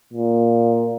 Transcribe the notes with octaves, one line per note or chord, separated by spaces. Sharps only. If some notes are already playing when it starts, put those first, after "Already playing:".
A#2